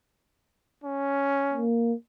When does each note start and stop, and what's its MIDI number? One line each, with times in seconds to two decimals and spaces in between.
0.84 1.65 61
1.54 1.93 58